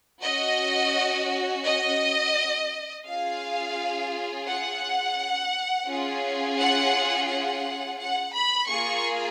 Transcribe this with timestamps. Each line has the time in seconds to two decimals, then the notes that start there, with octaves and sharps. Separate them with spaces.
0.23 C#4 F#4 D#5
1.64 D#5
3.05 C#4 F4 G#4 F5
4.46 F#5
5.87 C#4 F4 G#4
6.58 F#5
7.28 F#5
7.99 F#5
8.34 B5
8.69 A#3 F4 G#4 C#6